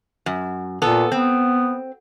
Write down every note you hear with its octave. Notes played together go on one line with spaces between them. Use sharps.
F#2
A#2 B3 A4
B3 C4